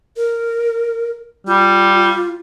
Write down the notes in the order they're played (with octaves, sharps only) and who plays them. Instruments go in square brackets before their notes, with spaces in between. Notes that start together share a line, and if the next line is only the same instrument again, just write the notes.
[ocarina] A#4
[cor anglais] G3 [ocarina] F4